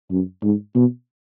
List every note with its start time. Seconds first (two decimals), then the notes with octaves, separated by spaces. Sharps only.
0.11 F#2
0.43 G#2
0.75 B2